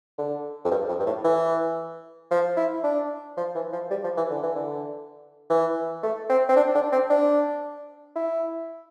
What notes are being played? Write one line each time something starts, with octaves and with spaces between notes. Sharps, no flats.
D3
F2
G2
F2
G2
A2
E3
F3
E4
D4
F3
E3
F3
G3
F3
E3
D3
E3
D3
E3
A3
C4
C4
D4
D4
C4
D4
E4